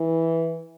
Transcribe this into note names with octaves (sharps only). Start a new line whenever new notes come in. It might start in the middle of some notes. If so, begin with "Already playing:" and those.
Already playing: E3